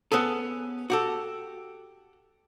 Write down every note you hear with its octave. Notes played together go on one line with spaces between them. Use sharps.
B3 C#4 G#4 A4
F#4 G4 A4